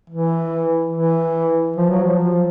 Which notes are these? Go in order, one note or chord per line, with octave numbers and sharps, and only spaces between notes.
E3
E3
F3
F#3
F3